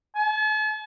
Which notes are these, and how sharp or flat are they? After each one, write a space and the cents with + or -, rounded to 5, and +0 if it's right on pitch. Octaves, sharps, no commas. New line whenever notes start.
A5 -45